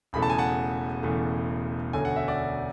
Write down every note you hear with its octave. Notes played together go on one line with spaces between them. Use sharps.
E1 E2 C#3 E3 A3 B5
A5
G#5
F#5 A5
E1 E2 C#3 E3 A3
E1 D2 D3 A3 C#4 G#5
F#5
E5
D5 F#5